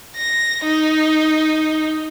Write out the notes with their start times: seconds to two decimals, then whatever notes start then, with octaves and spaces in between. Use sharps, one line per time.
0.16 A#6
0.64 D#4